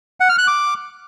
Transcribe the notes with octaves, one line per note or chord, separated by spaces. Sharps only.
F#5
F6
F#6
D6